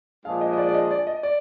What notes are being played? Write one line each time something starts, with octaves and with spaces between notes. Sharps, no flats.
A#2 F3 G#3 D4 G#4 F5
D#5
D#5
D5
D5
D#5
D5
D#5
D5